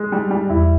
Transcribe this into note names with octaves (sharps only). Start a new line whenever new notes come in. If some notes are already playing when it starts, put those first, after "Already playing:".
Already playing: G#3
G3
G3
E2 E4